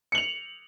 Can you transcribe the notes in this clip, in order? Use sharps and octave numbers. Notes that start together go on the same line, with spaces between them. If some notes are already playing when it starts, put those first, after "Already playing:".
C#7 F7 F#7